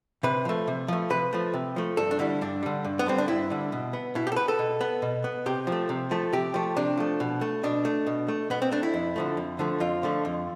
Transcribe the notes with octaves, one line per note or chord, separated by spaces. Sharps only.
C3 B4
F3 A3
C3
F3 A3
C3 B4
F3 A3
C3
F3 A3
G2 A4
D4
D3 G3 E4
G2 D4
D3 G3
G2
B3
D3 G3 C4
D4
G2 E4
D3 G3
B2
B3
B2 E4
G4
A4
B3 B4
A4
B2
B3
B2
B3
C3 G4
F3
A3
C3
F3 A3
C3 G4
F3 A3
C3 D4
F3 A3
B2
A3
B2 D4
A3
B2
A3
B2 B3
C4
A3 D4
E4
F2
D3 F3 A3
F2
D3 F3 A3
F2 F4
D3 F3 A3
F2